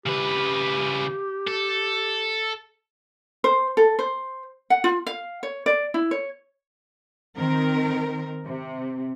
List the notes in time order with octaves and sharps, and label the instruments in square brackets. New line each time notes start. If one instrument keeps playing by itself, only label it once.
[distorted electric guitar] C#3 B4 [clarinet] G4
[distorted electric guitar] A4
[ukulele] C5
A4
C5
F#5
F4
F5
C#5
D5
E4
C#5
[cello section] D#3 C4 A#4
C3